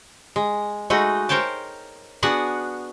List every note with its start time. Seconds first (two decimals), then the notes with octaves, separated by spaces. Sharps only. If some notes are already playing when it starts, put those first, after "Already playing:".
0.36 G#3
0.90 G#3 A3 D#4 F#4
1.29 A#4 C5 C#5 G5 A5
2.23 B3 D4 F#4 G#4 F#5